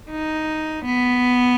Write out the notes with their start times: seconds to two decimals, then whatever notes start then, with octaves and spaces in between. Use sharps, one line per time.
0.11 D#4
0.85 B3